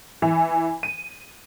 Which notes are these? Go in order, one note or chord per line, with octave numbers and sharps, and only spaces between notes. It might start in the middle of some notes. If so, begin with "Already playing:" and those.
E3
D#7